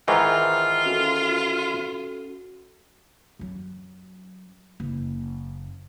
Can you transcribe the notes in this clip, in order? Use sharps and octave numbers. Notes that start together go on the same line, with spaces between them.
G#2 D#3 E3 F4
C#4 F#4 A4
F#2 F#3
F#1